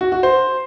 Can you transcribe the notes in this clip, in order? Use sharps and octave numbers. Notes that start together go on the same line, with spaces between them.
F#4
F#4
C5